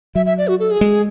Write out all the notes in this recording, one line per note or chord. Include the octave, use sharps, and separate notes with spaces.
F#3 E5
E5
D5
F#4
A4
G#4
G#3